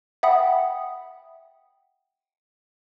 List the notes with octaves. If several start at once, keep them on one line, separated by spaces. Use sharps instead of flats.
E5 F#5 G5 B5 D#6